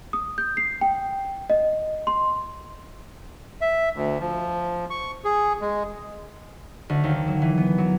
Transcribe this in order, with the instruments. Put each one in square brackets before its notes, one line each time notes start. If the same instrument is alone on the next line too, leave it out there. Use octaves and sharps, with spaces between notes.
[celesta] D#6
G6
C7
G5
D#5
C6
[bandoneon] E5
D2
F3
C#6
G#4
G#3
[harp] D2
D#2
F#3
E3
B3
F#3